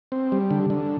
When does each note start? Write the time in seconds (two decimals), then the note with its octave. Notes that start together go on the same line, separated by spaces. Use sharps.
0.12 C4
0.32 G3
0.51 D3
0.70 D3